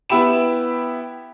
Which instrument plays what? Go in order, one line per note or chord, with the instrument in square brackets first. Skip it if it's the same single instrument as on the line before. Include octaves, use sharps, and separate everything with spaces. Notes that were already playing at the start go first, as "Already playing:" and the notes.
[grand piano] B3 E4 G4 B5 E7